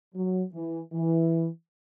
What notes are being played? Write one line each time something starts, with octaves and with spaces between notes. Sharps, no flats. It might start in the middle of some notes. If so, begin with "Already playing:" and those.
F#3
E3
E3